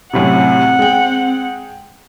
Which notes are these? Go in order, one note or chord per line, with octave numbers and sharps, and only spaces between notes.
F#2 A2 C3 C4 F#5
G#3 G5